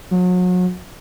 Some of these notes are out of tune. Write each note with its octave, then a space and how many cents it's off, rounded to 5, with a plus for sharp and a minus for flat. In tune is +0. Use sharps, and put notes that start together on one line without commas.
F#3 -35